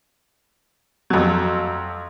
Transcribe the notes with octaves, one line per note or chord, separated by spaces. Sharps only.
F2 F#3